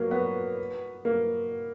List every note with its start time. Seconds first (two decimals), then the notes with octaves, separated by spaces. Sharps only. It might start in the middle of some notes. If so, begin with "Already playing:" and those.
Already playing: F#3 A#3
0.11 B3
1.05 A#3